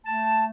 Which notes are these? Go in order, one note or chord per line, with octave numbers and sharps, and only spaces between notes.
A3 A5